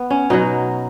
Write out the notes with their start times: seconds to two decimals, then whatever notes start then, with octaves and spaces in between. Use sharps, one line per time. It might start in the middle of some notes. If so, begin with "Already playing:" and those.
Already playing: B3
0.10 C#4
0.30 B2 F#3 D#4